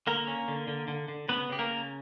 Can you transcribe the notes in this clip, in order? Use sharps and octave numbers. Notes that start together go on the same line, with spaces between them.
D3 A#3 A#4
C#4
D3
D3
D3
D3
C#3 B3 B4
C#3 G4
A#3 A#4
C#3